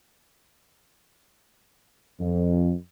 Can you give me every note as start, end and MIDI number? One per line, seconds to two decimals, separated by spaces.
2.20 2.73 41